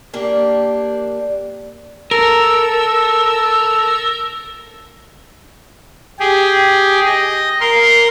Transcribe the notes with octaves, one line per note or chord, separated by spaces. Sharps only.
A#3 D4 G4
A4 A#4 E6
G4 G#4
D#5
A#4 C6